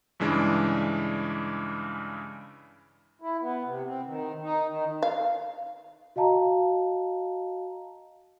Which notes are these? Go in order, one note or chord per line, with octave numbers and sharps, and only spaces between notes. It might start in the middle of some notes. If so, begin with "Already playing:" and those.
G2 C#3 E3 G#3 D4
E4
B3
C3
C4
D#3
D#4
D#3
F5
F#4 D#5 F5 A5 A#5